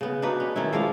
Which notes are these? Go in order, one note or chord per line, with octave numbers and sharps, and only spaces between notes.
C#3 B3
D4 D#4 F#4 B4
C#4
D#3 A3 C#4 E4
F3 G#3 D5 F5